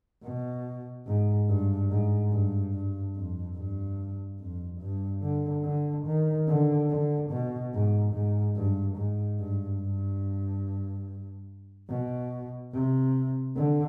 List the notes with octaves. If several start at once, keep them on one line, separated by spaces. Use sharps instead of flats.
B2
G#2
G2
G#2
G2
G2
F2
G2
F2
G2
D3
D3
D#3
D3
D3
B2
G#2
G#2
G2
G#2
G2
G2
B2
C3
D3